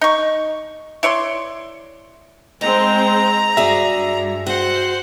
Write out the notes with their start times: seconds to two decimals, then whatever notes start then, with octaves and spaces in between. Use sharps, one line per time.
0.01 D#4 C#6
1.03 E4 C#5 D5 C6
2.61 G#3 C4 D#4 A#5
3.57 G2 F#4 G#4 D5 E5
4.47 F#4 G#4 C5 F#5